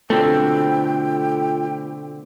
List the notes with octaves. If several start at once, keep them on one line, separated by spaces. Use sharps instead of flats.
B2 D3 A3 C4 F4 G5